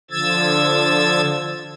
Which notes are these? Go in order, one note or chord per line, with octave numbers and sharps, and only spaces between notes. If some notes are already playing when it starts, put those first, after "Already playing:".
D3 F3 E6 G#6 A6